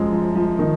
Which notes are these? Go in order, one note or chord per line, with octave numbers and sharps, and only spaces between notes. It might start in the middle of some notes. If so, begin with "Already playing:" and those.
Already playing: F#2 F3 G#3
F3
F3
D#3